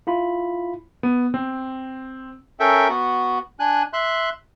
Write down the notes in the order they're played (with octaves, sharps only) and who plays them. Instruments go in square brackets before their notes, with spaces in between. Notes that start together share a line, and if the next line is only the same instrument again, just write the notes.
[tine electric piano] E4 F4 B5
[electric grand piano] B3
C4
[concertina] C#4 A4 A#4 E5 G5
B3 F#4
D4 G#5 F#6
E5 C6 F#6